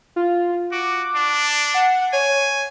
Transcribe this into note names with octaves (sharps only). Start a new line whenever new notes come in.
F4
F#4 D6
D4
F#5
C#5 G#5